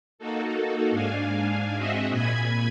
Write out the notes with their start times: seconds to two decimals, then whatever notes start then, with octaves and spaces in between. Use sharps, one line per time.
0.19 A#3 D#4 F#4 A4
0.91 G#2 D4 F5 G#5
1.76 C4 F#4 G#4 D#5 E5
2.10 A#2 G#5 B5 G#6